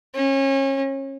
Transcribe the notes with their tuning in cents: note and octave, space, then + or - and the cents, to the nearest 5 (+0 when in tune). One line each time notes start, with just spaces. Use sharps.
C#4 -30